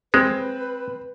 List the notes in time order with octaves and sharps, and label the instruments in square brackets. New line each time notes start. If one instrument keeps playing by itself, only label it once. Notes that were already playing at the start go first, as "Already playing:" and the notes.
[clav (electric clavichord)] G#3 [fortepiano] C4 [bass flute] B4